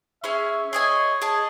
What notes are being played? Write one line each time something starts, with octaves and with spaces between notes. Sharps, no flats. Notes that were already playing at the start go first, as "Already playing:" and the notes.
C#4 G#4 C#5 E5
G#4 C#5 D#5 G#5
G#4 D#5 A5